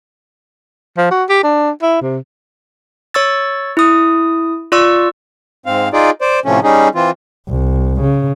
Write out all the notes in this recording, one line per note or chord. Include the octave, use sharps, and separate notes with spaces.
F3
F#4
G4
D4
E4
C3
C#5 C#6 E6 A6
E4 D#6
F4 D5 C#6 E6
G#2 C4 F5
D#4 F4 G#4 D5
C5 D5
A2 C3 F3 A3 C#4
G3 C#4 D#4 G#4
E3 C4 F4
C2
C#3